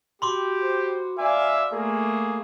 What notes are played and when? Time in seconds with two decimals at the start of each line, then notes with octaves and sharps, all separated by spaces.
0.22 F#4 G4 B5 C6 D6
0.62 C5
1.18 D5 E5 F5 G#5
1.72 A3 A#3 G#4